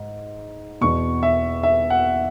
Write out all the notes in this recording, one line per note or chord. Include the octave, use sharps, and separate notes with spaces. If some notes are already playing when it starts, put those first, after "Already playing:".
Already playing: G#2
E2 B2 C#6
E5
E5
F#5